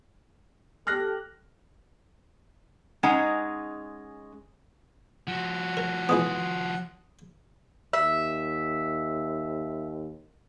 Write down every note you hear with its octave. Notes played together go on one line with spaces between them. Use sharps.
G4 A4 F6 F#6 A#6
G#3 C#4 D#4 G#4 F#5 A#5
F3 F#4 F#5
A#4
E3 G#3 B3 D#6
D#2 E5